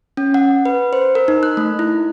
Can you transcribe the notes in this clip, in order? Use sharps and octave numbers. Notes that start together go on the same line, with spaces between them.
C#4
F#5
B4
C5
A#4
D#4
F#6
A3
E4